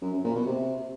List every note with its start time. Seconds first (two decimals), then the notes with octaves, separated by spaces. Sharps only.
0.02 F#2
0.13 F#2
0.24 A#2
0.35 B2
0.47 C3